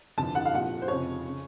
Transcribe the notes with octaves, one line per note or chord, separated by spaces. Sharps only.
G1 F2 D3 A5
F#5
F5
C2 A#2 F3 F#5
C5
F1 F2 C#3 F3 C#5
C#3